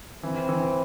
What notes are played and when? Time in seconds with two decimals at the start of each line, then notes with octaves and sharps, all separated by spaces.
0.23 E3 C4
0.49 E3